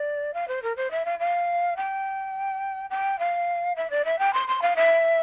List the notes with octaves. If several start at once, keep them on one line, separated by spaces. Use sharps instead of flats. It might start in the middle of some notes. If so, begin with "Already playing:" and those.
Already playing: D5
F5
C5
A#4
C5
E5
F5
F5
G5
G5
F5
E5
D5
E5
G5
C6
C6
F5
E5